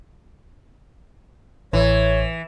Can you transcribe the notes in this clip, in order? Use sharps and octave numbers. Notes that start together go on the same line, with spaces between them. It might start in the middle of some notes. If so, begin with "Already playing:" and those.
A1 E3 C#5